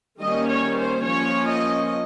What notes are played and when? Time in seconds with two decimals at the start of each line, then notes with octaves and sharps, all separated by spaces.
0.20 D#3 G3 A#3 C#4 D#5
0.49 C#5
0.77 C5
1.05 F3 A#3 C#4 C#5
1.47 D#5